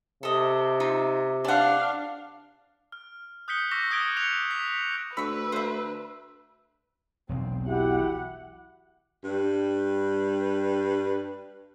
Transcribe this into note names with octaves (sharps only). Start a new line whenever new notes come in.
C3 A4 D#5
D#4 F4 E5
D4 D5 F5 F#5
F6
D#6 F#6 G6 B6 C#7 G7
C#6 D6 E6 G6 A#6 B6
D#6 F#6 G#6 D7 G7
F#6 C#7 F7 G7
B6
D2 B4 B5 C#6 E6
D2 C5 E5
E1 B1 C4
E4 F#4 G4 F#5
G2 G3 B4